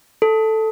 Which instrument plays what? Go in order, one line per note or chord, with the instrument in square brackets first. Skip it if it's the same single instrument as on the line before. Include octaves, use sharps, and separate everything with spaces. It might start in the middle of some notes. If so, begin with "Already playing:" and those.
[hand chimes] A4